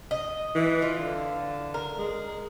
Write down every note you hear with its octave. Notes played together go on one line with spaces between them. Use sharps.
D#5
E3
F4
D3
A#4
G#3